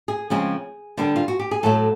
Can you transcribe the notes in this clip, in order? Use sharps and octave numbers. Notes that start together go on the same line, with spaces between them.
G#4
C#3 F3 G#3 C4 G#4
D3 G3 B3 D4
F4
F#4
G4
G#4
A2 F#3 A3 A4